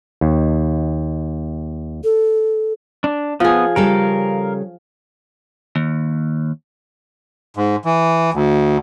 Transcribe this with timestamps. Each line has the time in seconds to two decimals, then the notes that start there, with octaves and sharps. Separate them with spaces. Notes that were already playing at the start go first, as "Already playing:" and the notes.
0.21 D#2
2.04 A4
3.04 D4
3.40 F3 B3 G#4
3.76 C#3 G3 A4 A#4 F5
5.76 D#2
7.57 G#2
7.85 E3
8.34 D2